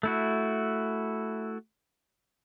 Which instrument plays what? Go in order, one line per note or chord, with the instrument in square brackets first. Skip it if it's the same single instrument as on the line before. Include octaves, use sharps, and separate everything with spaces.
[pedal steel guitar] A3 E4 F#4